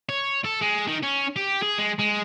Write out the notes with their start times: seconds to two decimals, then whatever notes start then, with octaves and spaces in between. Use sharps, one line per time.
0.09 C#5
0.45 A4
0.61 G#3
0.87 D#3
1.03 C#4
1.36 G4
1.62 G#4
1.78 G#3
1.99 G#3